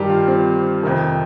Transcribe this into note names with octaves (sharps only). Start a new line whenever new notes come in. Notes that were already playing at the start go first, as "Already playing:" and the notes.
Already playing: G2 D#3 G4
F4
C4
F2 C3 D#3